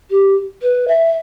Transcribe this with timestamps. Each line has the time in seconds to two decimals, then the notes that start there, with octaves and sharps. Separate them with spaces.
0.10 G4
0.62 B4
0.88 E5